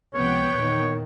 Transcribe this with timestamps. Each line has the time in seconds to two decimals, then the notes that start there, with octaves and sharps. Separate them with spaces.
0.14 C#2 C3 F3 B3 C#5 F#5 G5
0.52 E2 A#2 D#3